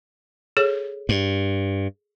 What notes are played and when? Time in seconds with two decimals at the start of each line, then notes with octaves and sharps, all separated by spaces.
0.57 G#4 A4 C#5
1.09 G2